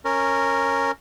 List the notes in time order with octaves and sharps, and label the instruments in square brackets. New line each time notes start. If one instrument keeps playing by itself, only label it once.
[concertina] C#4 A#4